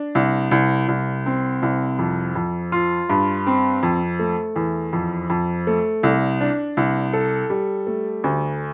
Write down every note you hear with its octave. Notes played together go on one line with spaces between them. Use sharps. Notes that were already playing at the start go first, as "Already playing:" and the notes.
Already playing: D4
C2
C2
C2
C4
C2
F2
F2
F4
G2
C4
F2
A3
E2
F2
F2
A3
C2
D4
C2
A4
G3
A3
D2